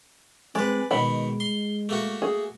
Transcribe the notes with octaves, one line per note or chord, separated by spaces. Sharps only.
G#3 C4 B4 D5
B2 D#3 G#3 B5
C6
A3 A#3 F#4
G#4